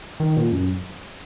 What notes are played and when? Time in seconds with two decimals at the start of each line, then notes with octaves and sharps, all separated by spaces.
0.20 D#3
0.37 A#2
0.52 F#2